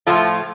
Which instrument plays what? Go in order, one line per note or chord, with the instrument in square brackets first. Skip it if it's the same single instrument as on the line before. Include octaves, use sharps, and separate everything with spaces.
[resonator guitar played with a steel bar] A2 F3 A3 F4